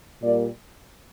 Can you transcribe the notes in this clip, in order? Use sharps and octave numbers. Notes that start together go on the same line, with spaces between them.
A#2 G3 A#3 D5